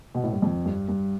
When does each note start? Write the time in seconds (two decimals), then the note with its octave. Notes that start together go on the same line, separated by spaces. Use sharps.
0.15 B2
0.24 A2
0.33 G2
0.42 F2
0.65 G2
0.89 G2